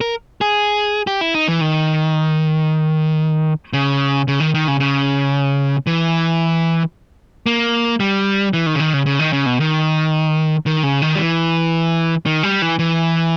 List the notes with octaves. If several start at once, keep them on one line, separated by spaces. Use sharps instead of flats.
A#4
G#4
G4
E4
D#4
E3
D#3
C#3
C#3
D#3
D#3
C#3
C#3
E3
A#3
G3
E3
D#3
C#3
D#3
C#3
C#3
D#3
C#3
B2
D#3
D#3
C#3
D#3
G3
E3
D#3
G3
E3
E3